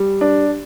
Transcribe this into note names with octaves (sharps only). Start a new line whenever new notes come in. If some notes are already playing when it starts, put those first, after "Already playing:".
Already playing: G3
D4